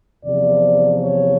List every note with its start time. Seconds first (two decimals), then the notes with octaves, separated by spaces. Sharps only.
0.25 E2 C3 F3 D5
1.00 C#5